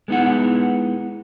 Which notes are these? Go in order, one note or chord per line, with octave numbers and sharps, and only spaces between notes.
G#3 B3 D#4 E4 F#5